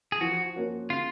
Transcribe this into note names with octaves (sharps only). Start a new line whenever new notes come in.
G#4
F3 F#4
A#3 C#4 F#4 A#4
C#3 F4